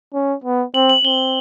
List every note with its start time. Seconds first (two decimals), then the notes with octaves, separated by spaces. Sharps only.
0.13 C#4
0.44 B3
0.74 C4 F#7
0.89 F#7
1.05 C4 G7